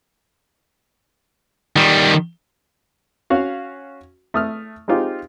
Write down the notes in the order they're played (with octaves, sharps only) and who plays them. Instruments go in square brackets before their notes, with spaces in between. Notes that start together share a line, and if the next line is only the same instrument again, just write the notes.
[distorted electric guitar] D#3 G3
[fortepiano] C#4 F#4 F5
A3 D#6 F6
G#3 C4 D#4 F4 G4